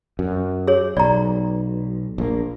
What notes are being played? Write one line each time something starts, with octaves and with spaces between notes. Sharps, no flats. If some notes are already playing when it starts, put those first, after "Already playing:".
F#2
G#4 C#5
B1 D5 A#5
A#1 A#3